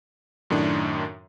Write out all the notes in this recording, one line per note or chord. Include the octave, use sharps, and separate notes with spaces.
F#2 A2 D#3 D4